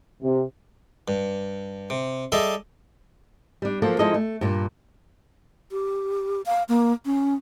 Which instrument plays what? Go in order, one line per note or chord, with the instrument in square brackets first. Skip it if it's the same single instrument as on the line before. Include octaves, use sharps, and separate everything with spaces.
[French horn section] C3
[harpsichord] G2
C3
G3 G#4 A4 D#5 E5
[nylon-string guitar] G3 D4
F3 F#3 A#3 A4
F3 G#3 D#4 E4 A4 D#5
A3
G2 A#2
[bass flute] G4
F5
A#3
C#4